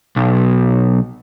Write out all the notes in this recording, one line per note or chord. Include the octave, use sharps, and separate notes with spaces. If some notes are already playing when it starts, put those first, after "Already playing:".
B1